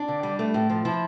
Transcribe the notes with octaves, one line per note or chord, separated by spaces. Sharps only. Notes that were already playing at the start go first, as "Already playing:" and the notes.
Already playing: D4
D3
G3
A3
A2
F3
F3 E4